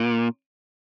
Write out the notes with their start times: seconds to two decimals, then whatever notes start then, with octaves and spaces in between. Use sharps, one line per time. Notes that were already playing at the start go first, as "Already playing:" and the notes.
Already playing: A#2